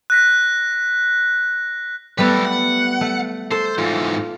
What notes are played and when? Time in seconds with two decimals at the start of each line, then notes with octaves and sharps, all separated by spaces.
0.10 F#6 A#6 B6
2.18 G3 A3 B3 A4 B4
2.45 F#5
3.01 A3
3.51 A4 C5
3.78 G#2 E3 F4